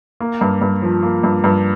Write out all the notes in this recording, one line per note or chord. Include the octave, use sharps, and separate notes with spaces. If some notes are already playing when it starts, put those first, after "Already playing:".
A#3
G2
G2
F3
A#3
G2
G2